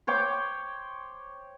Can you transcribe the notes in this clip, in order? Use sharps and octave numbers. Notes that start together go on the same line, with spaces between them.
C5 C#5 G5 D6